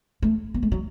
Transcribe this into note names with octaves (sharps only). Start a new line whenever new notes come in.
A3
B3
A3
F#3